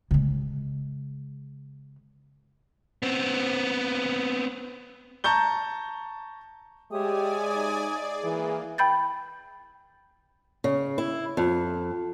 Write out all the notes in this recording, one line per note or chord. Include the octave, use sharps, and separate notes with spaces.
C#3 G#3
B3 C4
A5 A#5 C#6 G6 G7
G#3 G4 C#5 D5 E5 G#5 D#6
D#4
G#4 D5
E3 A#3 G#4
G5 B5 G6 A6
C#3
E4
F2